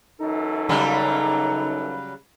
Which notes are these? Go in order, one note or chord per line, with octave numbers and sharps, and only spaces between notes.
F#2 E3 D#4 A4
C#3 F#3 G3 A#5